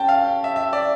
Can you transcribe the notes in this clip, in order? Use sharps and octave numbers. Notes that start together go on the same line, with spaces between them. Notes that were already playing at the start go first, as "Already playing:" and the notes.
Already playing: C#4 G5 A5
F5
E5
E5
D5